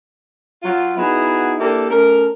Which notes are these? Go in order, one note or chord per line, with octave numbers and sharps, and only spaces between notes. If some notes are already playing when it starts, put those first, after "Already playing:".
F#3 F4
B3 D#4 E4 F#4 G#4
A#3 D4 E4 G4 A4
A3 C#4 A#4